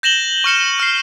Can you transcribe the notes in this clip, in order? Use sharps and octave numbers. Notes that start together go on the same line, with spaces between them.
G6 A#6 E7 F#7 G7
C#6 F6 C#7 E7
F6 C7